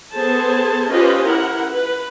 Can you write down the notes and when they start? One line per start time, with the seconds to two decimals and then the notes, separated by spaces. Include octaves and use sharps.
0.14 B3 G#4 A4 C5 A5
0.90 C#4 F4 G4 B4 C5 D#5
1.26 E4 A#4 F#5
1.72 B4